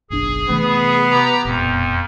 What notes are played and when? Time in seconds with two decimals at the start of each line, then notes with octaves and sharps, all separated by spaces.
0.10 F#1 B1 D4 G#4
0.49 C3 E3 A3 B3
1.11 G4 A#5
1.45 E1 F2 A#2 B3